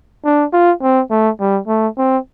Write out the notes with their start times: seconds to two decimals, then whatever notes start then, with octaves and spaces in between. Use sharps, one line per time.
0.25 D4
0.53 F4
0.82 C4
1.10 A3
1.40 G3
1.68 A3
1.98 C4